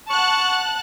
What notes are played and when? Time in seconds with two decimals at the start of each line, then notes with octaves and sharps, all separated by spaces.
0.10 F#5 A5 C#6 F#6